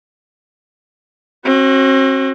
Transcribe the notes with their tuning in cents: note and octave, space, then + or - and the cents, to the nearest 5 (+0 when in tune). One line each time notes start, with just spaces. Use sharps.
C4 +45 F#4 +10